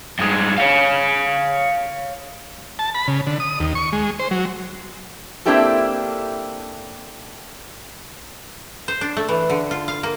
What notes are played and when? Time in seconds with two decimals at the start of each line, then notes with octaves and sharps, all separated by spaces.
0.19 G2 G#3
0.58 C#5 F5
2.79 A5
2.95 B5
3.08 C#3
3.27 D3
3.40 D#6
3.60 D#2
3.75 C#6
3.93 G#3
4.19 C5
4.31 F#3
5.46 A#3 C4 D4 E4 G4 A4
8.88 C5
9.01 D4
9.17 A3
9.29 E3
9.50 D3
9.71 F4
9.88 F5
10.03 A#3